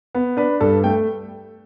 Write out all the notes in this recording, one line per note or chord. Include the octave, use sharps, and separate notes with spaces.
B3
D4 B4
G2 A4
A3 G5